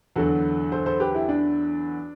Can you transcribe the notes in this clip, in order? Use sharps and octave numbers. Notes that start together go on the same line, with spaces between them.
E2 D3 F#3 F#4 A4
A4 C5
A4 C5
G4 B4
E4 G4
D4